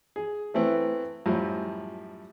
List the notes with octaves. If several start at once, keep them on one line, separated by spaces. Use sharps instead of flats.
G#4
E3 A3 B3 C4 E4
F#2 A2 F3 G3